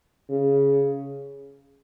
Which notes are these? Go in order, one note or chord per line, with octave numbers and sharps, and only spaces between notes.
C#3